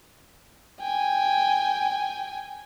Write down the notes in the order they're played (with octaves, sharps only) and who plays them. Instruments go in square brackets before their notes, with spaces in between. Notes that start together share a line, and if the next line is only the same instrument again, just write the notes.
[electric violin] G5 G#5